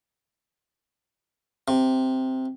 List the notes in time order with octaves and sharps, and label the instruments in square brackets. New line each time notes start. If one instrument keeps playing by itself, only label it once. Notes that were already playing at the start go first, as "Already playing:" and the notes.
[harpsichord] C3